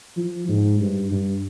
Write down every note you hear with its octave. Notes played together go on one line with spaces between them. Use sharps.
F3
G#2
G2
G2